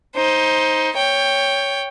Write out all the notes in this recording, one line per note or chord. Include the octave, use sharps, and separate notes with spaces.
D#4 C5
C#5 G5